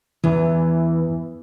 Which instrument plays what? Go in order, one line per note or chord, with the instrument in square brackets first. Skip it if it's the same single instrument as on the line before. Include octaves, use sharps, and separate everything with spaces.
[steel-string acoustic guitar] E2 [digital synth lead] E3